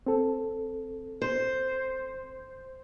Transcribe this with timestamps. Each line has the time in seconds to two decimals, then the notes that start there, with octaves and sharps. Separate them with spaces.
0.07 C4 A4
1.22 C5